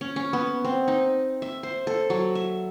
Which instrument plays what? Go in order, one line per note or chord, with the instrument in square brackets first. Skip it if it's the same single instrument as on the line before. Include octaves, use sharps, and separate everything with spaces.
[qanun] C#4
C#4
B3
C4
D#4
E5
C5
A4
F#3
E5